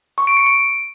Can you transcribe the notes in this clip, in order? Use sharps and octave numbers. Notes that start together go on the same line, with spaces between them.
C#6
D7
C#7
D7